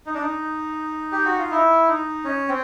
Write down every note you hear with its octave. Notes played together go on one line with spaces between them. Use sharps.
D#4
D4
D#4
G4
F#4
F4
E4
D#4
C#4
C4